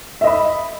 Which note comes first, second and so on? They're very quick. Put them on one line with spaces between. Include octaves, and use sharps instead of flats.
E5 D#5 B5